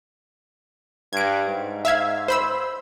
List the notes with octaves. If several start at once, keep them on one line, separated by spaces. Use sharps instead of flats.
G2 G#6 D7
G#2
E5 F5 G#6
C5 B5 E6